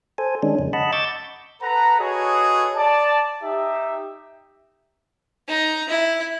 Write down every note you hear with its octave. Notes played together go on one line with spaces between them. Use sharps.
A4 C5 G#5
D#3 G#3 C#4 D4
F2 C#3
D#5 F#5 A5 B5
C#6 D6 E6 G6 A6
A4 B4 F#5 A#5
F#4 G#4 A4 B4 C#5 D#5
D5 A5
D#4 G4 E5
D#4 A#5
E4